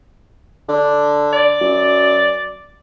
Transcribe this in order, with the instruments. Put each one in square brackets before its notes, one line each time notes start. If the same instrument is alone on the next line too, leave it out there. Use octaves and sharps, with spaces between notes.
[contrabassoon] D3
[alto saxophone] D5
[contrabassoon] F#2